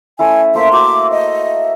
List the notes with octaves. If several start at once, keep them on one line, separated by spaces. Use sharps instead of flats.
A3 C#4 E4 G#5
A3 A#3 C5 E5
F#4 E5 D6
D#5 E6